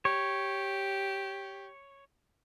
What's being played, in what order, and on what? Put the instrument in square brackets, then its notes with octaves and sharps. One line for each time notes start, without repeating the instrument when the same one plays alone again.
[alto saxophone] G4 [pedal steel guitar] C#5